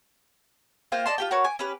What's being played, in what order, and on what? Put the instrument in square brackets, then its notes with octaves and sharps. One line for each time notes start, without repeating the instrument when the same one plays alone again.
[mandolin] A#3 F4 C5 G5
D5 D#5 A5 C6
F4 G4 G5
F#4 A#4 B4 C#5
G#5 D6
C#4 G4 B4